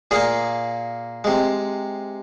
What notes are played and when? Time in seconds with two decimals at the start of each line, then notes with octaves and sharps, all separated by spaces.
0.11 A#2 A#3 G#4
1.24 C3 G#3